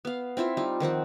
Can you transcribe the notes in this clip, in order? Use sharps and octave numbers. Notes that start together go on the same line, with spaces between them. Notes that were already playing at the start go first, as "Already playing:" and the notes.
B3 F5
C4 E4 F4 E5
G3 D#4 F4
D#3 F3 C4 F#5